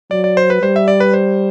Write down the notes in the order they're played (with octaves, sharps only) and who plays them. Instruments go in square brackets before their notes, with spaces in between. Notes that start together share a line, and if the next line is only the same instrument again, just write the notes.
[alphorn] F#3 [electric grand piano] D5
[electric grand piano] D5
C5
B4
[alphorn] G3 [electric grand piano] C5
[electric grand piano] E5
D5
B4
C5